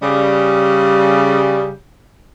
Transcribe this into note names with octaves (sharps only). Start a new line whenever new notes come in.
C#3 G3